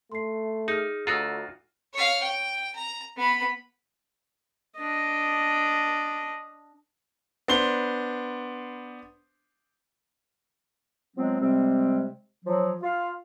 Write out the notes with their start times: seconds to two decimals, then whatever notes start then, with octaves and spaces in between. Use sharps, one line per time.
0.12 A3 C6 C7
0.68 D#4 G#4 F6
1.07 D2 F4 F#4 A#5 D#6 E6
1.93 C#5 F5
2.23 G5
2.76 A#5
3.17 B3 B5
4.78 D4 D#5
7.48 B3 D4 C5 C6 G7
11.17 F3 F#3 G#3 B3 C4
11.40 C3 G3 G#3 C4
12.45 F3 F#3
12.82 F4 F5